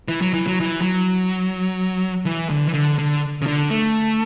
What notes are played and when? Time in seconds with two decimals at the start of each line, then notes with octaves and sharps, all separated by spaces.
0.08 E3
0.22 F#3
0.34 E3
0.47 F#3
0.60 E3
0.82 F#3
2.26 E3
2.50 D3
2.68 E3
2.74 D3
2.99 D3
3.42 C#3
3.46 D3
3.70 A3